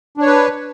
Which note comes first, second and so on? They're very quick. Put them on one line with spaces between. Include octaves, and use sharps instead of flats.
D4 C#5 B4